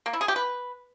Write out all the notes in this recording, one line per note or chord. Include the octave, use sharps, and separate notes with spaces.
A#3
E4
G#4
G4
B4